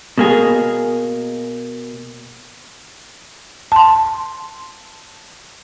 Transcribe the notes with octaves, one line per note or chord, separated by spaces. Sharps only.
B2 A#3 G#4
A5 C6